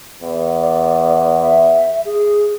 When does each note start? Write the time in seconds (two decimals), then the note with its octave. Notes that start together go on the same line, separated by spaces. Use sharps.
0.22 E2
0.61 D5
1.40 E5
2.05 G#4